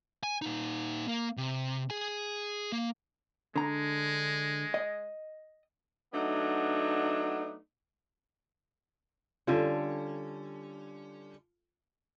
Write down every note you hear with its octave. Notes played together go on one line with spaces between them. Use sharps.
G#5
A#2 D#4
A#3
C3
G#4 G#5
A#3
D3 G#3 A#5
D#5
F#3 A3 B3 D4 D#4
D3 G3 C#4 F4 A4